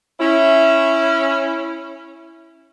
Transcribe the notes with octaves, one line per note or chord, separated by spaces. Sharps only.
C#4 E4